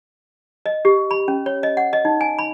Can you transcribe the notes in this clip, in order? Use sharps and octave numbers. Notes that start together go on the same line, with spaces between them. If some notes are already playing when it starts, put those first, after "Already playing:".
D#5
G4
B5
C#4
C#5
D#5
F#5
D#5
D#4
G#5
B5